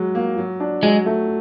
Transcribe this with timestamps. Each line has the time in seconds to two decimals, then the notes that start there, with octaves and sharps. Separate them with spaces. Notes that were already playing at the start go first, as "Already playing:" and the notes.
Already playing: F#3 G#3
0.15 A#3
0.38 F#3
0.60 D4
0.83 F#3 G#3
1.06 A3